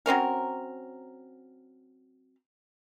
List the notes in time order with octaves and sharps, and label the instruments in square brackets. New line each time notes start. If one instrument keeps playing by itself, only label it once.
[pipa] F#3 C4 C#4 A#4